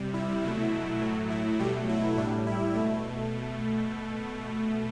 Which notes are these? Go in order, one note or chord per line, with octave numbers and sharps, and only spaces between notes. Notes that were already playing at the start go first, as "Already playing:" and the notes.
Already playing: C3 G3
E4
B2 F#3 A3 E4
A2 F#3 A3
E4
B2 F#3 G3 A3 G4
E4
A2 G3 D4
E4
B2 A3